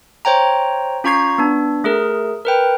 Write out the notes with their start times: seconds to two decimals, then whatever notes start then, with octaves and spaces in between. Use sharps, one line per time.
0.25 C5 C#5 G5 A#5
1.04 C#4 F4 A#5 C#6 G#6 C7
1.38 B3 D4
1.84 A3 G#4 A#4
2.45 A#4 B4 G5